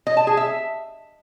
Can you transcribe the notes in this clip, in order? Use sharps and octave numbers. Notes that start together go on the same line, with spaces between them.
D#5
A5
G#4
E5